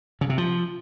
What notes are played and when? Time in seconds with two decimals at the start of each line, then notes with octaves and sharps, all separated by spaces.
0.21 C#3
0.29 C3
0.38 F3